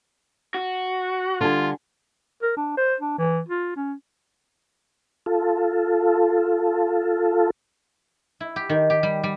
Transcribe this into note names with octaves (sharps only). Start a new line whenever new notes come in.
F#4
D3 G3 F4 G#5
A#4
D4
C5
D4
E3
F4
C#4
F4 A4
E4
G4
D#3
G4
G3
G3